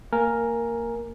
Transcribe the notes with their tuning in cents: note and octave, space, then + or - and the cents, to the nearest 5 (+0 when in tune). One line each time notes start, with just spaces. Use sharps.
A#3 -20 A#4 +0 G#5 +0